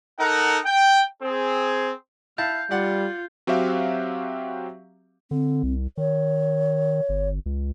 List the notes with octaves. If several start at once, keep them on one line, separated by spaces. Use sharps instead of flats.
D#4 A4 A#4 F#5
G5
C4 G#4
E4 F5 A5 G6
G3 F4 D5 F#5
F#3 C4 F#4 G4 E5 F5
D3 C4
C2
D#3 C#5
G1
C#2